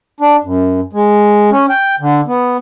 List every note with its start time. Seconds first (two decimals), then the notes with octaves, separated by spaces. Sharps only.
0.20 D4
0.43 F#2
0.93 G#3
1.51 C#4
1.69 G5
2.00 D3
2.26 B3